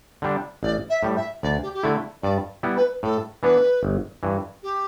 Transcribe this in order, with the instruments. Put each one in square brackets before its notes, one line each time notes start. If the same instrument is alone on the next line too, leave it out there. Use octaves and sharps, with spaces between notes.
[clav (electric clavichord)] D3 G3 D4
[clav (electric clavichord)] A1 [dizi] D5
[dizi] E5
[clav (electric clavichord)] A2 G3
[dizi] E5
[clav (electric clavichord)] D2 [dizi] D5
[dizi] G4
G4
[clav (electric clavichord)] D3 A3 E4 [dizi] A4
[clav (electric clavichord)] G2 [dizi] D5
[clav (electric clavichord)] G3 B3 E4
[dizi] B4
[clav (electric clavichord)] A2 [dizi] A4
[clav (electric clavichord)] E3 B3 D4 [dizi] B4
[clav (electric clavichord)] G1
G2 E3
[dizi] G4